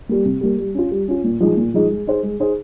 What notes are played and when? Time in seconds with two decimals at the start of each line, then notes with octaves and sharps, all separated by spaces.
0.09 G3 A#3
0.25 C3
0.41 G3 A#3
0.58 G3
0.75 C#4 F4
0.91 G3
1.08 C#4 F4
1.24 A#2
1.40 F3 G#3 D#4 G#4
1.57 A#2
1.74 F3 G#3 D#4 G#4
1.90 G#3
2.07 D#4 G#4 C5
2.23 G#3
2.40 D#4 G#4 C5